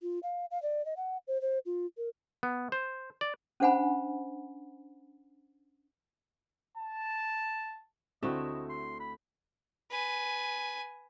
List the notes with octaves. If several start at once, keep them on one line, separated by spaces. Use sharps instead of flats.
F4
F5
F5
D5
D#5
F#5
C5
C5
F4
A#4
B3
C5
D5
C#4 D4 C5 F#5 G#5 B5
A5
D2 A3 C4 D4 E4 F#4 D#5 E7
C6
B5
B4 G#5